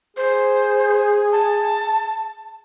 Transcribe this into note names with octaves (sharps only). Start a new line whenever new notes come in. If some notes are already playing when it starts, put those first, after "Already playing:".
G#4 C5
A5